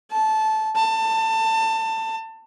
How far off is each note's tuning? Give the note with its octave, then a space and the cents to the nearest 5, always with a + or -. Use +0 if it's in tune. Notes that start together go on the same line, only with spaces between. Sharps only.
A5 -15
A5 +25